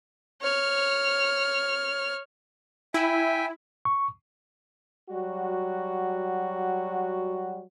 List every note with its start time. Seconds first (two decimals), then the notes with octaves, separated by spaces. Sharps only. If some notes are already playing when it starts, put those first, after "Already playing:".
0.41 C#5 F6
2.94 E4 E5 G5 G#5
3.85 C#6
5.09 F#3 G3 F#4